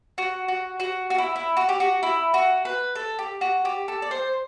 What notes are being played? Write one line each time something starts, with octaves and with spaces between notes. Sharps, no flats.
F#4
F#4
F#4
F#4
E4
E4
F#4
G4
F#4
E4
F#4
B4
A4
G4
F#4
G4
A4
D5
C5